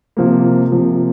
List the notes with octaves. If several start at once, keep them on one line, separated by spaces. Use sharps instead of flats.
C3 F3 A#3
C3 F3 A#3